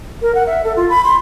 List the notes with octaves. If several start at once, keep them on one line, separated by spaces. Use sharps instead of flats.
A#4
F#5
E5
A4
F4
B5
C6